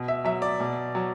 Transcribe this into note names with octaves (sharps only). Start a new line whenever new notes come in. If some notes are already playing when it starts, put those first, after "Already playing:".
Already playing: B2
E5
F#3 E5
D5
B2
F#3